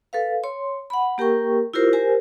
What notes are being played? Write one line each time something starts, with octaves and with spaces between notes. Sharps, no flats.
A4 B4 F5
C#5 C6
F#5 B5
A#3 G4 A#4 G5 C#6
E4 F4 G4 A#4 C5
G4 A#4 C5 G#5